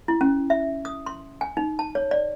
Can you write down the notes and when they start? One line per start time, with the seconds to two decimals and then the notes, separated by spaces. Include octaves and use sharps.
0.08 E4
0.21 C#4
0.50 E5
0.85 D#6
1.06 C6
1.41 G#5
1.57 D#4
1.79 A5
1.95 C#5
2.11 D5